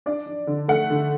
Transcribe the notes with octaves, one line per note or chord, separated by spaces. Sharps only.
D4 D5
D4
D3
A3 F#5
D3